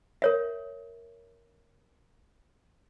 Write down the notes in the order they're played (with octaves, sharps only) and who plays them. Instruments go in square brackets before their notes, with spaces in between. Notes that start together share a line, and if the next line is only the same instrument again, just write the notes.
[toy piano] A#4 C#5 E5